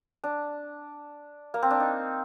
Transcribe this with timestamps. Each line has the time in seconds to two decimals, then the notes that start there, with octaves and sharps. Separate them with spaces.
0.24 D4
1.54 A#3
1.62 C4
1.71 D4
1.80 D#4